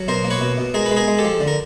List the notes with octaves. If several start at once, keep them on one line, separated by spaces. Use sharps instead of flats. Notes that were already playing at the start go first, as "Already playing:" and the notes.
Already playing: F#3
B2 A#4 C5
A#3
B4 C#5
B2
B2
G#3 G#4 A#4
G#3 B4
G#4 A#4
G#3
G4 A4
F3
D3
A#4